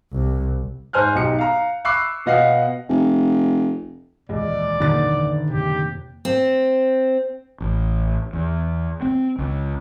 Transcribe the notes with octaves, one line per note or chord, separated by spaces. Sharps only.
C2
G#2 C5 G#5 F6 F#6
B1 D#4 G4 C#7
F5 A#5
B5 C#6 D6 E6 F#6 C7
B2 B3 D#5 F5 F#5 C7
F1
D#1 C#2 E3 A#3 D5
F#1 A#2 D3 D#3 F#6 A6
F2 C3 G4
C4
A1
E2
C4
C#2